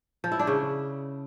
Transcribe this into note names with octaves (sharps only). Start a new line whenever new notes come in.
F3
E4
D4
C#3